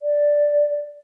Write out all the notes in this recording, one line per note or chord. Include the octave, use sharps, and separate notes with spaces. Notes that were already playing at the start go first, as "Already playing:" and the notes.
D5